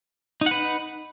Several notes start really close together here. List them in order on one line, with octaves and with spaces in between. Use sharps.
D#4 F#5 B4